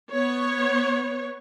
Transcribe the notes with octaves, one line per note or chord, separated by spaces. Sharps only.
B3 C#5